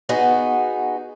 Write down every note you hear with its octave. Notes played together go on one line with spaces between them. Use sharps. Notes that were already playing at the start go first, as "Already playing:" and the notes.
B3 D#4 F#4 G#4